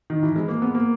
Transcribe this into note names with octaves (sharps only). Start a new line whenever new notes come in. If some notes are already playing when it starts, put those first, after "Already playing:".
D#3
E3
G#3
A#3
B3
A#3